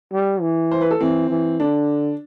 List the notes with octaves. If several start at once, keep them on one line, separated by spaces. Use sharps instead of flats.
G3
E3
C5
B4
A4
E3 C4
E3
D3 D4